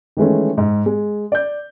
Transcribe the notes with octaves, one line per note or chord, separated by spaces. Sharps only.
D#3 E3 G#3 A3 C#4
G#2
G#3
D5 G6